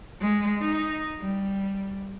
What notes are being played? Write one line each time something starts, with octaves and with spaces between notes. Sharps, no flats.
G#3
D#4
G3